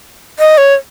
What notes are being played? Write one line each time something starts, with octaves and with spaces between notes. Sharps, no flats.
D#5
C#5